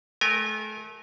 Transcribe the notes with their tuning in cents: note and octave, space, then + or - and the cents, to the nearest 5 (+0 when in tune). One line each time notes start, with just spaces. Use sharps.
A3 -35 A#4 -5 G#5 -30